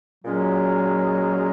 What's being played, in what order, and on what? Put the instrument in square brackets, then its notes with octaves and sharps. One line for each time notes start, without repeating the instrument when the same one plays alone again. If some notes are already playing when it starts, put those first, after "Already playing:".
[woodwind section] A#2 G#3 C#4 [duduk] F#3